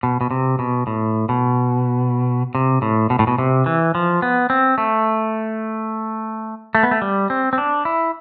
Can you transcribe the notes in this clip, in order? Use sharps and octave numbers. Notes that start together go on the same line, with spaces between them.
B2
B2
C3
B2
A2
B2
C3
A2
B2
A2
B2
C3
E3
F3
B3
C4
A3
A3
B3
A3
G3
C4
C4
D4
E4